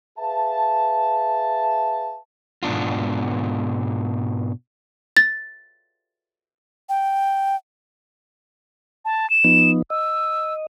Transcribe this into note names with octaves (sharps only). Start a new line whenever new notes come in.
G#4 B4 E5 F5 A5
G#2 B2 B3 D4 F4
A6
G5
A5
E7
F3 B3 D#4
D#5 E6